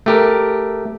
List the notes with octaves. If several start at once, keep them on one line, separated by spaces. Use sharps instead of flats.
A3 G4 A#4